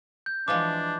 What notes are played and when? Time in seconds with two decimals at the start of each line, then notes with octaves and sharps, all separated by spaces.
0.26 G6
0.48 E3 F3 G#3 D4 D6